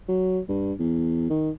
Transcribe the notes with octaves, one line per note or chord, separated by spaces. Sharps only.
F#3
G2
E2
D#3